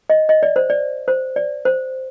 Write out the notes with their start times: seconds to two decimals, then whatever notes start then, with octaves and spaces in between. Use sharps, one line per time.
0.10 D#5
0.29 D#5
0.43 D5
0.56 C5
0.70 D5
1.08 C5
1.36 D5
1.65 C5